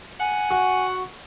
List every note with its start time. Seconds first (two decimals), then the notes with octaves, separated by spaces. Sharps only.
0.20 F#5 G#5
0.51 F#4